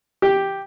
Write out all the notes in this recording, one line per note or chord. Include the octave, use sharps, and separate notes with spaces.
G4